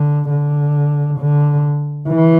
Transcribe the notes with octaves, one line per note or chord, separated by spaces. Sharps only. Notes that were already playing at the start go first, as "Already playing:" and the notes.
Already playing: D3
D3
D3
E3